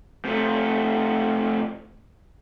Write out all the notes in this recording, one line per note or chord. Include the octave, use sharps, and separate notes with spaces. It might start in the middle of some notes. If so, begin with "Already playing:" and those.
C3 A3